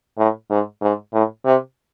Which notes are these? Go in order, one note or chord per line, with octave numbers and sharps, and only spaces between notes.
A2
G#2
G#2
A2
C3